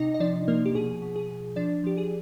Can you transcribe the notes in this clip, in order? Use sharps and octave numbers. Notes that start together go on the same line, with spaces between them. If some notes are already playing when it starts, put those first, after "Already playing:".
Already playing: C3 D#4 D#5
D#5
F3 D4 D5
F3 A#3 A#4
G4
B2 G#4
B2
G#4
B2
F3 D4 D5
F3 G4
G#4